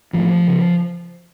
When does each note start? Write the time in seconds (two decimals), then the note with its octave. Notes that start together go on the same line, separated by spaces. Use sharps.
0.13 A1 A2 F3
0.47 C#3